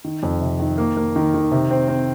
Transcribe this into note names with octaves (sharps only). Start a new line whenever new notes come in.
D#3
F2
C3
D#3
A#3
A#3
D#3
D#3
C3
C4
C4